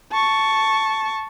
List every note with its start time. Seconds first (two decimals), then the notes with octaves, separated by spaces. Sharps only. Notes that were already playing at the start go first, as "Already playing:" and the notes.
0.12 A5 C#6